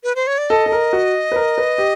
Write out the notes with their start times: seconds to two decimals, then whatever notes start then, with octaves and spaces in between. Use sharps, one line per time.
0.04 B4
0.16 C5
0.27 C#5
0.38 D5
0.50 A4 D#5
0.66 A4
0.72 A#4
0.93 F#4
1.32 B4
1.36 A#4
1.58 B4
1.78 G4